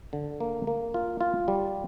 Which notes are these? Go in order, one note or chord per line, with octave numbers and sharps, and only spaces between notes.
D3
A#3
A#3
F4
F4
G3